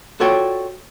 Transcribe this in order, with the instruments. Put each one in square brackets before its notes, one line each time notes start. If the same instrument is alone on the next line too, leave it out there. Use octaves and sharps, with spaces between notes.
[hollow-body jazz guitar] F4 F#4 A4 C#5 D5 G5